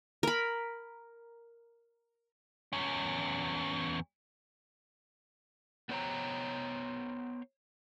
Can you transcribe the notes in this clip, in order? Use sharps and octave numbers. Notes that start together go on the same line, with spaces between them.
A#4 B5
E2 C#4
B3 D4 C5 C#5 G5 A#5